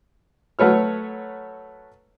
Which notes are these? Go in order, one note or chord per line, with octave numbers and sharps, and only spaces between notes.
F#3 A3 B4 C#5 F6